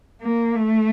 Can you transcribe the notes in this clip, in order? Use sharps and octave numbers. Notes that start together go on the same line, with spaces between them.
A#3
A3